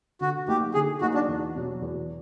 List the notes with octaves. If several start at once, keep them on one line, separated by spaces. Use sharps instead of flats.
D3 F#4
F#3 A#3 D#4 G4
D3 G#4
F#3 A#3 D#4 F#4
D4
E2
B2 F#3
E2